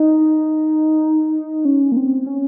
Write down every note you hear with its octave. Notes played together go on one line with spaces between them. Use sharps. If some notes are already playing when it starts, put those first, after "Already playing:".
Already playing: D#4
C#4
A#3
C4
C#4